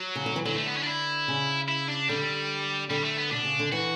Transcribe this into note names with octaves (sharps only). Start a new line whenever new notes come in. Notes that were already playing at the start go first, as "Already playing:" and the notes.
Already playing: F#3
C#3
D3
E3
D3 F#3
A3
B3
C#4
D4
E4
C#3
E4
D4
D3 G3
D3 G3
A3
B3
B2 D4
C#3
D3
E3 F#4